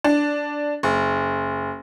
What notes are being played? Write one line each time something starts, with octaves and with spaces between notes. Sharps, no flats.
D4
F#1